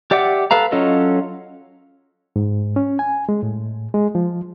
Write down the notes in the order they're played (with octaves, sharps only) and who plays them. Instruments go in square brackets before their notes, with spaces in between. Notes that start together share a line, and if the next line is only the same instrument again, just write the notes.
[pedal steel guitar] G4 D5 E5 F#5 D6
A4 B4 F5 A#5
F#3 C#4 F4 A4 D#5
[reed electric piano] G#2
C#4
G#5
G#3
A2
G#3
F3